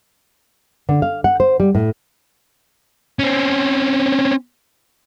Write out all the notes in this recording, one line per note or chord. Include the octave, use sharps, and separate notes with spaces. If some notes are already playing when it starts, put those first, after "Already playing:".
D3
F5
F#5
C5
G3
A2
C4 C#4